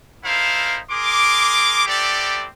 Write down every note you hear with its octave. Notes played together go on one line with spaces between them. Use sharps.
D#4 E4 A4 A#4 C5 F5
G#4 A#4 C6 D6
B3 C4 E4 G4 A4 D5